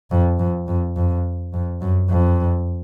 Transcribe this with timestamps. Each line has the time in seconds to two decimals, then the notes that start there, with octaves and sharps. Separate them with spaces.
0.11 F2
0.39 F2
0.68 F2
0.96 F2
1.53 F2
1.81 F#2
2.10 F2